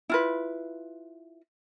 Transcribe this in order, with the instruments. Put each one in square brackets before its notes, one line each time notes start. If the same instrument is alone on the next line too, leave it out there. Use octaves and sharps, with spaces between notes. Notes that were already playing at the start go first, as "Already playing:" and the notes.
[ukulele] E4 F4 B4